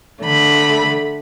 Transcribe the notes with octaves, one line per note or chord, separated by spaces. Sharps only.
D3 A3 B5